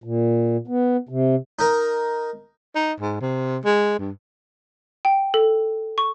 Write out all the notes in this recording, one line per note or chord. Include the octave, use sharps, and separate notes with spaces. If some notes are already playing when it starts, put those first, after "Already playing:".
A#2
B3
C3
D#4 A#4
D#4
G#2
C3
G#3
G2
G5
A4
C#6